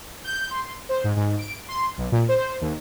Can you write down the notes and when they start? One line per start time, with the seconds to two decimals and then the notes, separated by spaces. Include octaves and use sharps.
0.24 G6
0.51 C6
0.89 C5
1.04 G#2
1.16 G#2
1.39 D7
1.68 C6
1.98 B1
2.12 A#2
2.28 C5
2.61 D#2